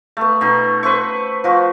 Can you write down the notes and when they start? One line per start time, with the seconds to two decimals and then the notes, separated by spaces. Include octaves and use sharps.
0.17 A3 B3
0.41 B2 D#4
0.83 B4 C5 E5 C#6
1.44 F3 F#4